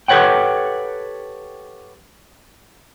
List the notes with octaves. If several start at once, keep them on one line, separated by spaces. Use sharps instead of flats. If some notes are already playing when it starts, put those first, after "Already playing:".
G4 A4 B4 C#5 F#5 G5